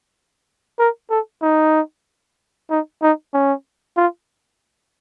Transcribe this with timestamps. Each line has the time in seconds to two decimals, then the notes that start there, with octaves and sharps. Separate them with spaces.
0.79 A#4
1.10 A4
1.42 D#4
2.70 D#4
3.02 D#4
3.34 C#4
3.97 F4